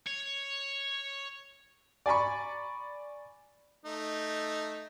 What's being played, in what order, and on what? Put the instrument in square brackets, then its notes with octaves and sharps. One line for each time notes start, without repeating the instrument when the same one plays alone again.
[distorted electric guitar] C#5
[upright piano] D5 G#5 A#5 B5 C#6
[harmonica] A3 D#4